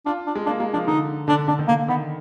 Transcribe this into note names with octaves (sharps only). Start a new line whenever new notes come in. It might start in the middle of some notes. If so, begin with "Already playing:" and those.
D4 F4
D4
G#3
A#3 D4
G#3 A#3
F3 D4
D3 D#4
D3 D4
D3 D4
D#3
D3 A#3
D#3 B3